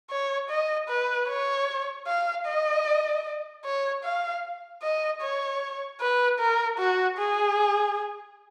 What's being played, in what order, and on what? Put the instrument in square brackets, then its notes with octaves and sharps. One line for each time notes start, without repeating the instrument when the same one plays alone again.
[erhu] C#5
D#5
B4
C#5
F5
D#5
C#5
F5
D#5
C#5
B4
A#4
F#4
G#4